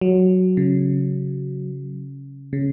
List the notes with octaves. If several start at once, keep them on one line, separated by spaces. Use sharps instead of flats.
F#3
C#3
C#3